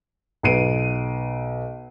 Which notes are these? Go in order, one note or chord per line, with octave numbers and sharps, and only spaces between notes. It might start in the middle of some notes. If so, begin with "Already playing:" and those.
B1 B4 C7 D7 D#7